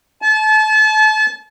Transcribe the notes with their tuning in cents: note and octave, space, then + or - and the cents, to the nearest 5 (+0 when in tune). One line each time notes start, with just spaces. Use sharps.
A5 -35